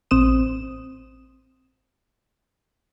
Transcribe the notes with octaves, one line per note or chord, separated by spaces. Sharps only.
A1 C4 C5 D#6 E7